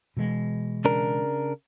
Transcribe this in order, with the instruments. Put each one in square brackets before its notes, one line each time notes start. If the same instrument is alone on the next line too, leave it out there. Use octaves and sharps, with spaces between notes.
[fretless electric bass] B2 E3 G#3
[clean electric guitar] C#3 D4 A#4